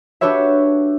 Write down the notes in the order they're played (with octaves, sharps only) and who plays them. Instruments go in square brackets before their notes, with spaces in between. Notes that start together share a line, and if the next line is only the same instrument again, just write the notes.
[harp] D4 F#4 G4 B4 C#5 E5